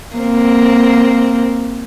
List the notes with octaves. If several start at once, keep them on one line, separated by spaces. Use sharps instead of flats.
A#3 C4